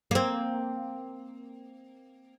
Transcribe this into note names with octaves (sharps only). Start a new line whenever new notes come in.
A#3 C4